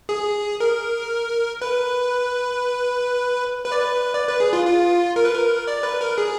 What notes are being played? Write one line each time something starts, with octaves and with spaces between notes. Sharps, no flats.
G#4
A#4
B4
B4
D5
B4
D5
B4
G#4
F4
F4
A#4
B4
A#4
D5
B4
A#4
G#4